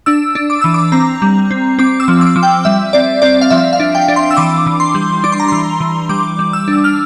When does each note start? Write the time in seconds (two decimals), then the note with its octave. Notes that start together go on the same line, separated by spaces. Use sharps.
0.06 D4 E6
0.35 D4
0.50 D6
0.61 E3 E6
0.74 D6
0.92 C4 A#5
1.22 G3
1.51 C4
1.79 C4 D6
2.00 E6
2.08 F3
2.21 D6
2.36 F3
2.43 G5
2.65 G3 E5
2.93 C4 D5
3.22 C4 D5
3.41 F5
3.50 F3 E5
3.73 F5
3.80 D4
3.95 G5
4.08 D4
4.16 C6
4.31 E6
4.37 E3 D6
4.66 E3
4.80 C6
4.95 G3
5.24 D4 D6
5.32 C6
5.40 A#5
5.48 E3 C6
5.81 E3
6.09 G3 D6
6.39 G3
6.53 E6
6.68 D4
6.73 E6
6.84 F6